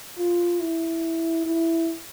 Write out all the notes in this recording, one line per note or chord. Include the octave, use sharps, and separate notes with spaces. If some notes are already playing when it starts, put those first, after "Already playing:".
F4
E4
E4